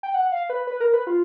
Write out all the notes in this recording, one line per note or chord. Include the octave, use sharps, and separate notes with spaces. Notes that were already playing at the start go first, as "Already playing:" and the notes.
G5
F#5
F5
B4
B4
A#4
B4
F4